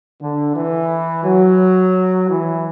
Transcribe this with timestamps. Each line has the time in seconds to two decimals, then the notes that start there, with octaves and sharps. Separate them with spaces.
0.21 D3
0.55 E3
1.24 F#3
2.29 E3